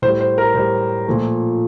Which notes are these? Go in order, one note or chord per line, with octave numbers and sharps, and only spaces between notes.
A2 G3 C5
C5
A#4
A2 G3 C5
A#2 F3 A3